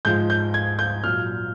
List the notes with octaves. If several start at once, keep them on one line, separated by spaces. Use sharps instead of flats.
G#2 F3 G#3 G6
G6
G#6
G6
A#2 F#3 F6